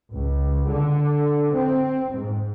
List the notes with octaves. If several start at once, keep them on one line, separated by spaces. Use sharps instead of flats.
C#2
D3
C4
G#2